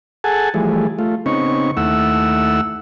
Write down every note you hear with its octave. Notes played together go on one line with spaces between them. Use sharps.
G#4 A4 F#5 G#5 A5
E3 F3 G3 A3 G#4
A3 F4
C#3 B3 C4 D#4 C#6
D#2 A3 E4 F#5 E6